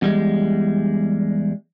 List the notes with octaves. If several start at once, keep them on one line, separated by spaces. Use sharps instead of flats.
E2 G3 G#3